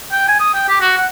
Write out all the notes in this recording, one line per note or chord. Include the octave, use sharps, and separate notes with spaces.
G5
G#5
D#6
G5
G4
F#4
F#5